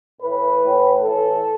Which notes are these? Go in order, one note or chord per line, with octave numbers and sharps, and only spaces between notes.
A2 E3 B4
A2 E3
A2 E3 A4